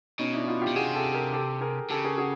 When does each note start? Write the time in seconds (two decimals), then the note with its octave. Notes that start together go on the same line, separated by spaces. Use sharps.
0.19 B2 C#4 D#4
0.33 D4 E4
0.48 D#4 F4
0.62 F4 G4
0.68 B2
0.76 C3 F#4 G#4
0.95 G4 A4
1.14 G#4 A#4
1.33 G4 A4
1.61 G#4 A#4
1.90 C#3 G4 A4
2.04 G#4 A#4
2.18 F#4 G#4